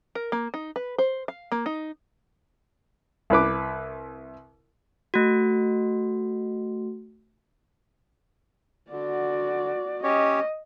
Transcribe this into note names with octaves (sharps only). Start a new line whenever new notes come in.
A#4
A#3
D#4
B4
C5
F5
A#3
D#4
C2 E4 B4 D6
A3 F#4
D3 F#4 D5
C#4 G4 C#5 D#5